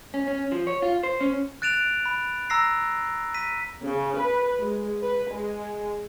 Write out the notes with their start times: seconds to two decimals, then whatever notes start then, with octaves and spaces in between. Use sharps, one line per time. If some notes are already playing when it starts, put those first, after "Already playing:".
0.14 C#4
0.28 C#4
0.52 F3
0.67 C#5
0.82 F4
1.03 C5
1.21 C#4
1.62 F#6 A6 D7 E7 F7
2.06 B5
2.50 A#5 E6 A#6 C7
3.34 B6 D#7
3.83 C#3
4.19 B4
4.61 G#3
5.01 B4
5.30 G#3